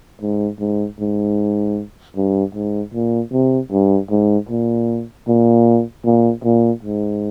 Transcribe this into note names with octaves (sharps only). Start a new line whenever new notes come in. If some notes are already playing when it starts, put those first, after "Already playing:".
G#2
G#2
G#2
G2
G#2
A#2
C3
G2
G#2
A#2
A#2
A#2
A#2
G#2